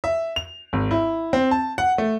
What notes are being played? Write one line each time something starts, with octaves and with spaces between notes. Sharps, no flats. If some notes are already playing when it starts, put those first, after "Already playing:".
E5
F7
G#1
E4
C4
A5
F#5
A3